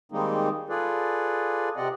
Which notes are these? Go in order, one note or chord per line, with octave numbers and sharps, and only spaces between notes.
D#3 G3 G#3 A#3 C4 D#4
F4 G#4 A4 B4 D5
C3 C4 D5 D#5 F#5